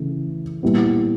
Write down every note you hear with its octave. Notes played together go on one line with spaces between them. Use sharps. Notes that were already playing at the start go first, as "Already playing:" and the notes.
Already playing: C#3 E3 A3
A#2 G3 B3 E4